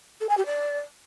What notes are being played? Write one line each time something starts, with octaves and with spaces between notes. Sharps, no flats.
A4
G#5
G4
D5